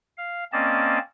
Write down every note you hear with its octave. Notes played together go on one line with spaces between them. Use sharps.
F5
A#3 C4 C#4 D5 D#5 A5